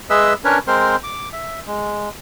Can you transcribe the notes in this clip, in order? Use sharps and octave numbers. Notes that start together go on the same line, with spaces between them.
G#3 G#4 B4 D#5 E5 E6
C#4 D4 A#4 B4 C#5
G#3 C4 A#4 C5 C6
D6
E5
G#3